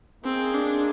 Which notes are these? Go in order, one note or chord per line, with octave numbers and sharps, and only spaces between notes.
A#3 C4 D#4 G#4
D4